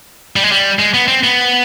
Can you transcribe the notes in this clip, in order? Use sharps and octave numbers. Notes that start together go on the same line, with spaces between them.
G3
G#3
G3
G#3
B3
C4
B3